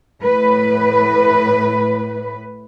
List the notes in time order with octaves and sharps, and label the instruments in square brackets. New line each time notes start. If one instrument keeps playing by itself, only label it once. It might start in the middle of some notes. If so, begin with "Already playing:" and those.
[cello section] A2 B4